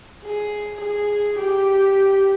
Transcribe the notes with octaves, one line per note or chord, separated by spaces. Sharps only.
G#4
G#4
G4